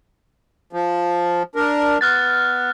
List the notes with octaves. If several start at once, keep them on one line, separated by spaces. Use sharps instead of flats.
F3
D4 A#4
B3 F6 F#6 A6